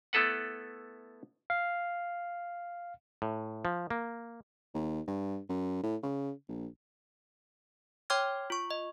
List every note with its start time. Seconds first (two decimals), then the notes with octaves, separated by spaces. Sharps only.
0.13 A3 B3 E4 A4 B4 F#5
1.50 F5
3.22 A2
3.65 F3
3.90 A#3
4.74 D#2
5.07 G2
5.49 F#2
5.83 A2
6.03 C#3
6.49 A#1
8.10 C#5 G5 C6 D6 F6 G#6
8.50 F4 C#6
8.71 D#5